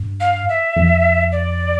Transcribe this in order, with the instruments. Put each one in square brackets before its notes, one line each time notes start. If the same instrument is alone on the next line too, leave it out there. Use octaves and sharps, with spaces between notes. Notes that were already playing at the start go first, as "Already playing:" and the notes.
Already playing: [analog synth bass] G2
[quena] F5
E5
[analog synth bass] F2
[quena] D5